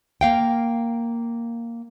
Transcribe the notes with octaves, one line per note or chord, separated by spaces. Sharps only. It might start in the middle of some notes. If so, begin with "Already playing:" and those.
A#3 F5 G5